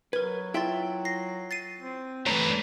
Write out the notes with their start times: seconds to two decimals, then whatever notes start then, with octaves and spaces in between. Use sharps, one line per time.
0.13 F#3 A#4 B4 G#6
0.54 E4 F4 E5 G5 C6 A6
1.05 A#6 C7
1.51 A6 C7 D#7
1.80 C4
2.26 G2 E3 A3 B4 C#5 A#5